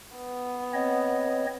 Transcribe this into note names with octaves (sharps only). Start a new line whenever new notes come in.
B3
C4 C#5 D#5